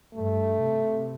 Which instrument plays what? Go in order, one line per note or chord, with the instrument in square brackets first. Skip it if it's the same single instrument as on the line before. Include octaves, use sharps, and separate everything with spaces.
[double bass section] G2 [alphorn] A3
[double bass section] C3